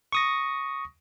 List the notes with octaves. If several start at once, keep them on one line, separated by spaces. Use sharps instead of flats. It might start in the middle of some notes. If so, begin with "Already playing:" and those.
C#6 D#6 A#6